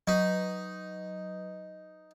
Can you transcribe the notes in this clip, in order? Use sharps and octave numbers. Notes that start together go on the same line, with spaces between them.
F#3 D#4 B4